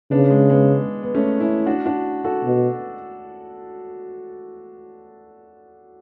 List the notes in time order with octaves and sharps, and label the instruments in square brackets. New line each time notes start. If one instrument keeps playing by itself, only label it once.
[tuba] C#3 [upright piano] B3 D4
[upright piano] G#3
G#3 B3
B3
A3 C#4
C#4 E4
D4 F#4
D4 F#4
F#4 A4
[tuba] B2